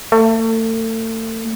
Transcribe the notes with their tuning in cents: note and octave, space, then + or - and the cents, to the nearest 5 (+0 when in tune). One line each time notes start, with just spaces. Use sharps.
A3 +35